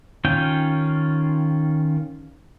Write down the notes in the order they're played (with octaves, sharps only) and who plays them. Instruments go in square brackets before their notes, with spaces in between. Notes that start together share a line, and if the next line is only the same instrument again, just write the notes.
[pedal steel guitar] D#3 C#4 F4 G5